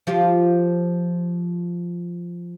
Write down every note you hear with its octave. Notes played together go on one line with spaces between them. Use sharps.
F3 F4 G4